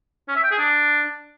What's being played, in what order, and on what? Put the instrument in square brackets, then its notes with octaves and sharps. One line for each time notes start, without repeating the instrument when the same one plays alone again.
[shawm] C#4
E5
G5
G#4
D4